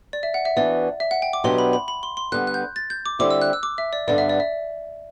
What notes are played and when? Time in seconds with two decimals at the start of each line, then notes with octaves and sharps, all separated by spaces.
0.13 D5
0.23 E5
0.34 F#5
0.45 E5
0.56 E3 B3 D4 F#4 D5
1.00 E5
1.11 F#5
1.22 G5
1.33 D6
1.44 B2 F#3 B3 D4 G4 C6
1.58 B5
1.73 B5
1.88 B5
2.03 C6
2.17 C6
2.32 D3 G3 B3 F#6
2.47 F#6
2.54 G6
2.76 A6
2.90 G6
3.06 D6
3.19 D3 G3 C4 E4 G4 D6
3.31 E6
3.42 F#6
3.53 E6
3.63 D6
3.78 E5
3.93 D5
4.08 G2 D3 G3 B3 D5
4.18 E5
4.29 D5
4.40 E5